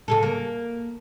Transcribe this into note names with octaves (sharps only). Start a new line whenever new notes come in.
C#3 G#4 A4
A#3